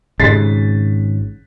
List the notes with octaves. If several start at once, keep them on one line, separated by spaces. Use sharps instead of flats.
G#1 G#2 C#3 A6 B6 C7